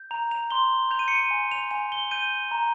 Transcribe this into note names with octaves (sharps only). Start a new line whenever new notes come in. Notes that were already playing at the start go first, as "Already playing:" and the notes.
Already playing: G6
A#5 F7
F7
C6 G7
G6 F7
D#7
C#7
D#7
G#5
F7
G#5 F7
G7
G6 D#7
A#5